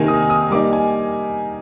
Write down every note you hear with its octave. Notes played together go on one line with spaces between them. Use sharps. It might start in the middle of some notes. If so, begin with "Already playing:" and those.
Already playing: C3 D#3 A#3 G#5
D#6
D#6
G3 A#3 D#4 D6
G#5